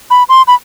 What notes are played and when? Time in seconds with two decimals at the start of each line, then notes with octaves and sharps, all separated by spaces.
0.11 B5
0.29 C6
0.48 B5